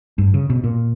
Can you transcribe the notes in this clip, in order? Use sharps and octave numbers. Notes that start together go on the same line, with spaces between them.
G2
C#3
B2
A#2